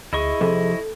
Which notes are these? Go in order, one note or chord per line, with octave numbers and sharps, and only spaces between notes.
D2 E4 G#4 D#5 C#6
F2 C3 A4